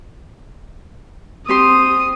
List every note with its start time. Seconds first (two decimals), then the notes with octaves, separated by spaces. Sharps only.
1.48 C4 G4 C6 D#6